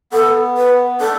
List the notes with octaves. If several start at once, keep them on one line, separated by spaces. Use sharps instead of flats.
B3 A4
B4
D4 A4